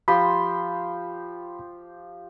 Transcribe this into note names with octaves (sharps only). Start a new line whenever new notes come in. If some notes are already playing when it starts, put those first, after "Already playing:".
F3 G4 B5 C6